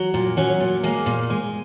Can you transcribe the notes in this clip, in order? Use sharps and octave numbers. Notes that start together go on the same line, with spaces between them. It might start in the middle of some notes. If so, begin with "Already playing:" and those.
Already playing: F#3
A#2
F#3 C#4
A#2
G#3 A#3
A#2
G#3